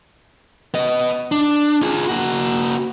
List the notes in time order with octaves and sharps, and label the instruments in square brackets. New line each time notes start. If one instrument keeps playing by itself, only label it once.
[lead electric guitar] B3 D#5
D4
F4 G#4
A#3 F#4